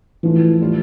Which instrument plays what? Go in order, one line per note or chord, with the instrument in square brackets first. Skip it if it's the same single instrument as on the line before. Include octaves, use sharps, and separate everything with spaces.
[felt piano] A2 F3 A3 [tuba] E3
[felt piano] A2 G3 D4 F4